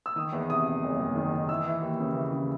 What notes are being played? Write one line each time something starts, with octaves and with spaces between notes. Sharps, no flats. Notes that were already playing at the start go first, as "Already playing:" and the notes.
E6
D#3 D#6
E2
C3 D#6
C3
F#1
F#1
D#3
D#3
E3 E6
E3
D#2
C#3
E3
C#3